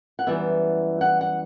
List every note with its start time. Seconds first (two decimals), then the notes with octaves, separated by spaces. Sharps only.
0.19 F#5
0.27 F#2 E3 G3 B3 E5
1.01 F#5
1.21 F#5